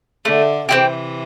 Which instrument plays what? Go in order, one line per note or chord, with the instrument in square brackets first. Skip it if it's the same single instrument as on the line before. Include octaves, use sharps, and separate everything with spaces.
[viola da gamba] D3 [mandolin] A3
[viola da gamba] C3 E3 [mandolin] C4 E4 G4